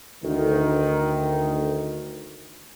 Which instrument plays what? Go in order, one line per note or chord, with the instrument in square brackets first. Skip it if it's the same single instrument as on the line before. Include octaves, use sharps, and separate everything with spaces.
[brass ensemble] D2 D#3